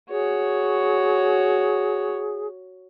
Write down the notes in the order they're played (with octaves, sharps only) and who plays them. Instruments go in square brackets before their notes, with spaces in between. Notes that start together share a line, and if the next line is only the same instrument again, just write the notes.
[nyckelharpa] F#4 C#5 [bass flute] G#4